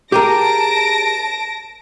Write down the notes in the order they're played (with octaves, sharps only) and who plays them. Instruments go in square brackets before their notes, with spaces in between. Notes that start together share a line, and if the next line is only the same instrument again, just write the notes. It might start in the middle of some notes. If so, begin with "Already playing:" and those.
[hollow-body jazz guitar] G4 G#4 A#4 [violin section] A5 A#6 D7